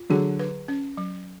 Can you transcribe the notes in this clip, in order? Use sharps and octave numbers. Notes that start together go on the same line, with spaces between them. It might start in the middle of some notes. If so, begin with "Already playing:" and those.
Already playing: F4
D3 F#3 G#4
B4
C#4
F#3